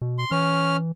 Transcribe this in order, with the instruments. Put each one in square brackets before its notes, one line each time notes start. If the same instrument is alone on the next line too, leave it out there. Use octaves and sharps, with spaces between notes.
[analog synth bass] B2
[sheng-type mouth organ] C6
[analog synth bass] E3 [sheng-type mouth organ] C#4 F6